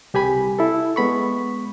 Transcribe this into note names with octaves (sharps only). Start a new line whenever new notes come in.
C2 G4 G#5 B5
E4 A4
G#3 B3 B5 C#6